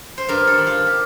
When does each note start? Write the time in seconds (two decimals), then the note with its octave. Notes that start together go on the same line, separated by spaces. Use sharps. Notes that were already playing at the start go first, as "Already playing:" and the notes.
0.18 C5
0.28 G2 A#4
0.47 A4
0.58 D#3
0.67 F4
0.87 G4